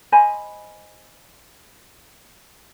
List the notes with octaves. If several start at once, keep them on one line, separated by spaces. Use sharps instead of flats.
C5 D#5 G#5 B5